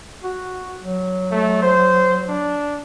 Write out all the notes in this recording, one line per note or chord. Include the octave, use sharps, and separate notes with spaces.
F#4
F#3
A3
C5
D4